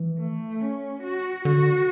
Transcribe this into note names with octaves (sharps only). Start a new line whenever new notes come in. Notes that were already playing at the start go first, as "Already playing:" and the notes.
Already playing: E3
A3
C#4
F#4
D3 F#4